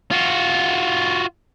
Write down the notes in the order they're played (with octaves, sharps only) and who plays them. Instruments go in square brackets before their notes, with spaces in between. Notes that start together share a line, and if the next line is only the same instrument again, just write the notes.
[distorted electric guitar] F4 F#4